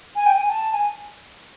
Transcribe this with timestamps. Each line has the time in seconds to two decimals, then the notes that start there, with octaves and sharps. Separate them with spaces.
0.15 G#5
0.26 G5
0.37 G#5
0.49 A5
0.72 G#5